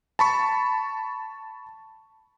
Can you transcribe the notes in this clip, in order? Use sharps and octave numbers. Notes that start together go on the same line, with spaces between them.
A5 B5 C#6